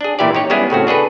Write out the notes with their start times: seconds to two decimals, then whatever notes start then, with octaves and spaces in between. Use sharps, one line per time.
0.01 D4 G#4
0.19 A#2 E3 E4 G4 D5
0.35 D#4 G4 C#5
0.50 G3 G#3 B3 C#4 E4 G#4
0.70 A2 C#3 C4 F#4
0.87 D4 G#4 A4 B4